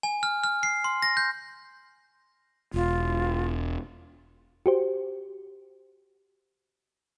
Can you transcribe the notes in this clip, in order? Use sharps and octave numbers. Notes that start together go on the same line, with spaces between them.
G#5
F6
F6
C7
C6
A#6
G6
E1 F4
F#4 G4 C5